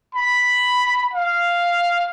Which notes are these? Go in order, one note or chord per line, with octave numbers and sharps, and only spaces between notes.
B5
F5